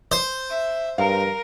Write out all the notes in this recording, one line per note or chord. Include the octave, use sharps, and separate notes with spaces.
C5
E5
G2 A#4 F5